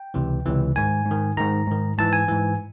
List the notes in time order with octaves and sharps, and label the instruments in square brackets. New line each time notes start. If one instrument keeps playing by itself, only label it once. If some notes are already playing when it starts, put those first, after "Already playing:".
Already playing: [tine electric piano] G5
C#2 C3 E3
C#2 C3 E3
G#2 D#3 G#5
G#2 D#3
G#2 D#3 A#5
G#2 D#3
G#2 E3 A5
G#5
G#2 E3